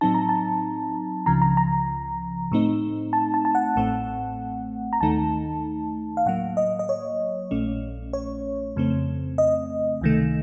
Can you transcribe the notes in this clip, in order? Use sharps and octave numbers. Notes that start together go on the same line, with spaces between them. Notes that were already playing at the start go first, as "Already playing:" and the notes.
A2 F#3 C4 D#4 A5
A#5
A5
C#2 C#3 F3 A#5
A#5
A#5
A2 A3 C4 D#4
A5
A5
A5
F#5
A1 A2 A3 C4
A#5
D#2 D#3 A3 D#4 A5
F5
A2 F#3 A#3 F#5
D#5
D#5
C#5
A#1 A#2 A3 C#4
C#5
F2 C#3 A3 C4
D#5
C#2 C3 D#3 A3